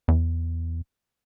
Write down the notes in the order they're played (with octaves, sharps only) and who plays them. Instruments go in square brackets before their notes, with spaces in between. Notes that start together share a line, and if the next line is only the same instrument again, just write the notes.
[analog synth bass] E2